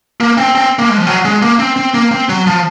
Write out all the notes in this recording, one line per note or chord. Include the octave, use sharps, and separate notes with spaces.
A#3
C4
C4
A#3
G#3
F3
F#3
G#3
A#3
C4
C4
A#3
C4
F#3
F3